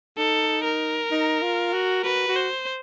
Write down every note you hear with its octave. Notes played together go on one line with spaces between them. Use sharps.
D#4 A4
A#4
D#4
F4
F#4
F#4 B4
F#4
C5